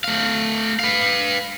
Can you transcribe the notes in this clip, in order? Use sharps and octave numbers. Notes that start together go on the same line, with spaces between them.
A3 F5
B4 F5